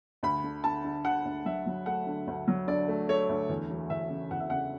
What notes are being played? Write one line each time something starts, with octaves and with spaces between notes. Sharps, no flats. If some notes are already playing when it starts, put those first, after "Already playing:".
D2 B5
D3
D3 A5
D3
D3 F#5
D2
F#3 E5
F#3
A3 F#5
D3
D2
F#3
D3 D5
A3
A3 C#5
D2
E2
E1
E2 E5
C#3
E2 F#5
E5
C#3 F#5